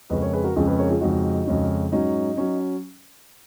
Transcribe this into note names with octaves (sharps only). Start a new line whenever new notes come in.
F2 C#3 G#3 C#4 B4 D#5
A#4 C#5
G#4 B4
F#4 A#4
F2 C#3 G#3 C#4 F4 G#4
G#4 B4
A#4 C#5
F4 G#4
F2 C#3 G#3 C#4 D#4 F#4
F2 C#3 G#3 C#4
G#2 F#3 C#4 D#4
F#3 C#4